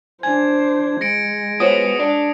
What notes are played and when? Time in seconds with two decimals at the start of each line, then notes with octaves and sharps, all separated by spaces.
0.23 D4 C5 G#5 G#6
1.01 G#3 A#6 C#7 D7
1.60 B3 F4 F#4 C5 C#5 D#6
2.00 D4 D5